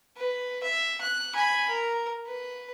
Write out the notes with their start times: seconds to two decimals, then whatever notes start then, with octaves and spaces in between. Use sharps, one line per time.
0.17 B4
0.63 E5
1.01 F#6
1.35 G#5 B5
1.69 A#4
2.26 B4